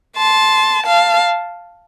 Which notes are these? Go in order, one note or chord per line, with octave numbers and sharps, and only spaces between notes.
A5 C6
F5 A5